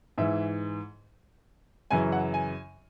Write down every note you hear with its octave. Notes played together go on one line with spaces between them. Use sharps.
G#2 E3 E5
F#2 C#3 E3 G#5
F#5
G#5